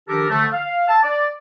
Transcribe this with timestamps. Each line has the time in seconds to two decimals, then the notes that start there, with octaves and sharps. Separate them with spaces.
0.08 D#3 F3 D4 G4 A4 A#4
0.29 D3 F3 A3
0.53 F5
0.88 A5
1.03 D5